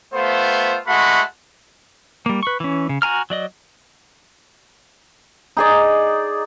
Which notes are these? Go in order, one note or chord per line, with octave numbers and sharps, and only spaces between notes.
A3 B3 F4 C5
G#3 A3 F#4 F#5 B5
G3 A#3
B4 C#6
E3 C#4
C#3
F#4 G#5 A#5 F6
F#3 D5 D#5
D#4 G#4 D5